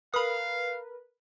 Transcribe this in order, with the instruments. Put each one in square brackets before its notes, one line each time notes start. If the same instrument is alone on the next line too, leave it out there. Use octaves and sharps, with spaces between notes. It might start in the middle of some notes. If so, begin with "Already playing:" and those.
[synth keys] A#4 B4 [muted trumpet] F5 [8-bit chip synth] B5 D#6